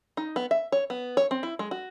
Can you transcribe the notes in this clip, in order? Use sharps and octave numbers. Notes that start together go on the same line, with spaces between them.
D#4
B3
E5
C#5
B3
C#5
C4
E4
G#3
F#4